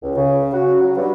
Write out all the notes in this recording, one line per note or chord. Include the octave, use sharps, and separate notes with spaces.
C#2
C#3
F#4
F#3
G2